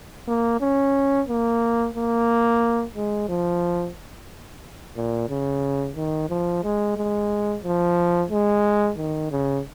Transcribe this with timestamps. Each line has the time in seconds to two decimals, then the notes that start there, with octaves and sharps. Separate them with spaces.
0.28 A#3
0.61 C#4
1.28 A#3
1.95 A#3
2.96 G#3
3.29 F3
4.97 A#2
5.30 C#3
5.96 D#3
6.29 F3
6.64 G#3
6.96 G#3
7.64 F3
8.31 G#3
8.97 D#3
9.31 C#3